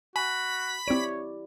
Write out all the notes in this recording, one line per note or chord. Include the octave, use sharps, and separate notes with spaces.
F#4 G#5 B5 B6
C4 E4 G4 C#5 D5 D7